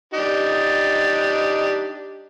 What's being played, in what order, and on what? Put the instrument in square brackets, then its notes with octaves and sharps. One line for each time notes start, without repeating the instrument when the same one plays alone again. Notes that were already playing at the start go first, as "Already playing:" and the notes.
[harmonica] D4 D#4 G4